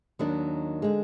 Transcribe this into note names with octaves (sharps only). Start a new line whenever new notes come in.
D#2 D#3 F#3 D4
D3 G#3